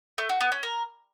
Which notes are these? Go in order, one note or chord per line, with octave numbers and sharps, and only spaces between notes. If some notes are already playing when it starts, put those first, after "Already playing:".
A3
F#4
B3
C#4
A#4